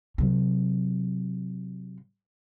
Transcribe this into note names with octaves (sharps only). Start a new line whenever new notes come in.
C3 F#3